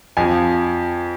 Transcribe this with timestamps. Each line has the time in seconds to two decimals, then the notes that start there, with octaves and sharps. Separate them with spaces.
0.17 F2 F3 G#5